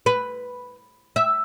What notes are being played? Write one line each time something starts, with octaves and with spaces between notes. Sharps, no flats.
B4
E5